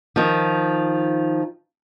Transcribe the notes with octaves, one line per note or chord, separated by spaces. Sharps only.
D#3 F3